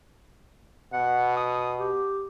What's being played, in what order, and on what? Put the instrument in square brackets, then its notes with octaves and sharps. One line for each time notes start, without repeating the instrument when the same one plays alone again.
[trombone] B2 [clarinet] F#5
[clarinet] D#6
G4